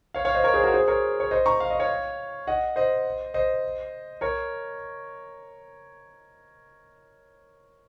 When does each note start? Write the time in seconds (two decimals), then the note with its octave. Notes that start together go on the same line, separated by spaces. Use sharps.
0.14 C#5 F5
0.25 C#5 F5
0.35 C5 D#5
0.44 A#4 C#5
0.54 G#4 C5
0.63 F#4 A#4
0.73 G#4 C5
0.88 A#4 C#5
1.20 C#5
1.31 C5 D#5
1.46 A#5 C#6
1.60 F5
1.70 D#5
1.80 C#5 F5
2.47 D#5 F#5
2.76 C5 D#5
3.34 C5 D#5
4.21 A#4 C#5